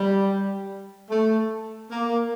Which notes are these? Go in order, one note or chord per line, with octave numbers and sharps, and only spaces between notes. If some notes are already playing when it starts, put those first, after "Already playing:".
Already playing: G3
A3
A#3